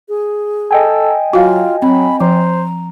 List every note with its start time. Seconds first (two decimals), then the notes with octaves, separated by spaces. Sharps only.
0.09 G#4
0.71 A4 D#5 G5 G#5
1.33 F#3 F4 F#4 F5
1.82 F#3 C4 B5
2.20 F3 C5 A#5